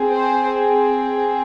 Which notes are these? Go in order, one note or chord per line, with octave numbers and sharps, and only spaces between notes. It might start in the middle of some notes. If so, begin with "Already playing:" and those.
Already playing: C4 G#4
C5